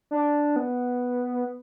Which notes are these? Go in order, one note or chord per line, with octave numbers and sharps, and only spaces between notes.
D4
B3